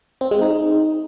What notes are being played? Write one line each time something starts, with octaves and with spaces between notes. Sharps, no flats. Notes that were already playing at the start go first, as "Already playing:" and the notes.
C4
G#3
D#4